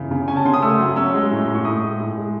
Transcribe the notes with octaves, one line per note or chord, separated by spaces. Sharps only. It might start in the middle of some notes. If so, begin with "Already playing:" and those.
Already playing: F#2 C#3 E3
C#3
C#4 G#5
A5
C#3 C6
D#6
A3 E6
F#3
C#4 E6
G#3
A2
A2
C#6
A2 D#6
G#3
A2
G#3